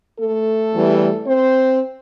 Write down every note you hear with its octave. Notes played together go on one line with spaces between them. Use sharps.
A3 A4
E2 E3 G3
C4 C5